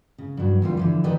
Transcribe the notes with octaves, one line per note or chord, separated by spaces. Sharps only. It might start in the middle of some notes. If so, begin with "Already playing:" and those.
C#3
G2 F#3
E2 D3 E3 G3 F4 C5
D3 E3 F3
D#3 G4 A4 B4 D5 D#5